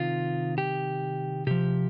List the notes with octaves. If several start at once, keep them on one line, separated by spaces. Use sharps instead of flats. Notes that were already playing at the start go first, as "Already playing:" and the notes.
Already playing: C3 D#3 F4
G4
C3 F3 G4